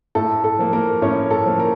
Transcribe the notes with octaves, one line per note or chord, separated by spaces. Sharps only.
A2 A4
A4
F3 A#3
A#3 A#4
A2 C#4 C#5
A4
F3 A#3
A#4